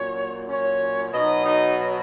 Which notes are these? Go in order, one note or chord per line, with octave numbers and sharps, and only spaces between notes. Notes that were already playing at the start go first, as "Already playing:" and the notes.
Already playing: A#2 F#3 C#4 C#5
C#4 C#5
B2 F#3 D#4 D#5
D#4 D#5